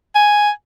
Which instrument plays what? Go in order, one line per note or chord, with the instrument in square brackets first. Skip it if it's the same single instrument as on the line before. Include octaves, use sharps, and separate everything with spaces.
[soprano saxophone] G#5